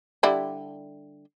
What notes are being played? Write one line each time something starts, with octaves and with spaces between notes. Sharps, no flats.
D3 G3 E4